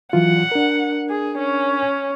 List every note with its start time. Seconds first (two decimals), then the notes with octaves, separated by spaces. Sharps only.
0.13 E3 F#3 F4 F#5
0.52 D4 A#4
1.09 G#4
1.39 C#4